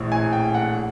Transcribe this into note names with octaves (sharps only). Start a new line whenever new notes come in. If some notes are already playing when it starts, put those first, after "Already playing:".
Already playing: A#1 A2 E3
G#5
G5
F#5